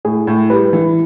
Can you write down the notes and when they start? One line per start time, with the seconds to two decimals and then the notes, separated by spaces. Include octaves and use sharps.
0.05 A2 G#4
0.27 A2
0.50 G3 B4
0.73 E3